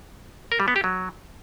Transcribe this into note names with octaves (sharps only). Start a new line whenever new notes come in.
A#4
G3
B3
G4
F#3